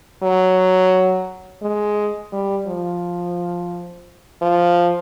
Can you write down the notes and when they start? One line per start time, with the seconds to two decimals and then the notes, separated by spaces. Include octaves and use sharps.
0.23 F#3
1.63 G#3
2.33 G3
2.67 F3
4.42 F3